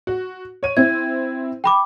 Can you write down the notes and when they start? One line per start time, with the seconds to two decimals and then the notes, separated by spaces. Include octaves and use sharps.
0.07 F#4
0.63 C#5 D#7
0.77 C4 E4 G#6
1.64 G5 B5 D6